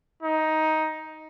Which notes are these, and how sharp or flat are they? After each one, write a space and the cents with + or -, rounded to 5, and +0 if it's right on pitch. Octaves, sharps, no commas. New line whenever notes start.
D#4 +10